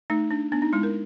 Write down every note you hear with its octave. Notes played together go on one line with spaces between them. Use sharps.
A3 D#4
D4
B3 D4
D#4
G#3 E4
A#4